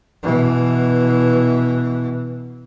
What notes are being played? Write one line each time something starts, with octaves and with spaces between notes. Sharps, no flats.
B2 E3